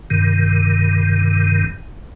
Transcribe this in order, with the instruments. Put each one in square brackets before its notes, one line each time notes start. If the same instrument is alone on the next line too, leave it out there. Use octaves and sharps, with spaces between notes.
[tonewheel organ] G2 C3 D#3